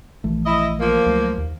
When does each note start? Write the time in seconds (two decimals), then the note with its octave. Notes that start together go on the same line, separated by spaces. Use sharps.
0.24 A#1 E3 A3
0.46 E4 D#5
0.80 F3 A#3
1.06 C#2 F#3 A3
1.38 D#2